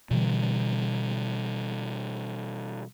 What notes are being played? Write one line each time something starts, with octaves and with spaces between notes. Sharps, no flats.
B2 D3 E3 G3